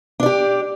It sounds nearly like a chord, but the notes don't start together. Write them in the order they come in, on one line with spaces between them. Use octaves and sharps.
D4 D5 G4